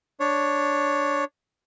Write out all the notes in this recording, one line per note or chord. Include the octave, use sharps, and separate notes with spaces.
D4 C#5